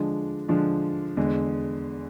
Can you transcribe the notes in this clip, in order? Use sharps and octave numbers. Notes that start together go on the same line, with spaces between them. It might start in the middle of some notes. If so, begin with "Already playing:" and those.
Already playing: D3 F3 G#3 D4
D3 F3 G#3 D4
E2 D3 G#3